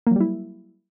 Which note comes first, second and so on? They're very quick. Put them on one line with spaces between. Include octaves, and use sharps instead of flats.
A#3 F#3 G3 E4